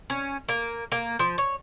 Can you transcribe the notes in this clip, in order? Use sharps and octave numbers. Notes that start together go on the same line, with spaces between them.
C#4
A#3
A#3
F3
C#5